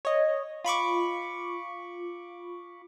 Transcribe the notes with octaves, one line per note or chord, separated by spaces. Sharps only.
C#5 D#5
F4 B5 C#6 D6